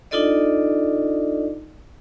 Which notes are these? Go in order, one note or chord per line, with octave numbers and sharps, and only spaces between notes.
D4 D#4 F4 A4 D5 D#5